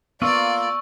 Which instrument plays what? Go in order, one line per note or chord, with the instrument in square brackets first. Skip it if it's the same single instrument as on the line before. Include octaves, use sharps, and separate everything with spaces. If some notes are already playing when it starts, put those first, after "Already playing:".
[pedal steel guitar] A#3 F4 [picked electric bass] B3 [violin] D5 [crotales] C#6 E6